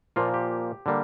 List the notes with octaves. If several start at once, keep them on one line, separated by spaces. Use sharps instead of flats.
A#2 F3 A#3 F4
G4
D3 G3 A#3